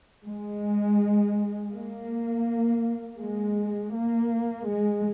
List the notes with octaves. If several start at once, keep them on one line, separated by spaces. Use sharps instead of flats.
G#3
A#3
G#3
A#3
G#3